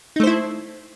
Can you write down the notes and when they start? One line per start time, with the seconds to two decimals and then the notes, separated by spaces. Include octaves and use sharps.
0.16 D#4
0.20 A3
0.23 C5
0.27 E4